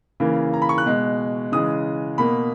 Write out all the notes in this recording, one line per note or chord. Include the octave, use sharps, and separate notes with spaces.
C#3 E3 A#3
A#5
B5
C#6
F#6
B2 G#3
C#3 E3 G#3 D#6
B2 A#3 B5